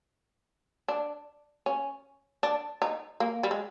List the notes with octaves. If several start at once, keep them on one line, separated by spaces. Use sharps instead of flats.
D4
C#4
D4
D#4
A#3
G3
G#3